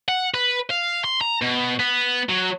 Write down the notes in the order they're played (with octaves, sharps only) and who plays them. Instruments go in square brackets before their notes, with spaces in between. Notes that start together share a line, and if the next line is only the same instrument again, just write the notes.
[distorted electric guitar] F#5
B4
F5
C6
A#5
B2
B3
F#3